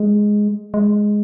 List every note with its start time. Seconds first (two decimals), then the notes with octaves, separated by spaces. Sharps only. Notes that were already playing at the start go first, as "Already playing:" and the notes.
Already playing: G#3
0.74 G#3